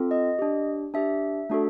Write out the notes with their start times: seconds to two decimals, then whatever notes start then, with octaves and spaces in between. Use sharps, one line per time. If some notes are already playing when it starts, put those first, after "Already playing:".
Already playing: C4 F4 A4
0.11 D#5
0.39 D4 G4
0.94 D4 G4 E5
1.50 A3 D4 F#4 A4